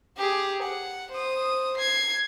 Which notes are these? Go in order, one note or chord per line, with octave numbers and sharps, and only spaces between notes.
G4 G#4
F#5
C5 D#6
G#6 C7